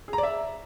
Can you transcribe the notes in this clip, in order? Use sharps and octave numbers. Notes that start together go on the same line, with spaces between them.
G#4
A#5
D5
E5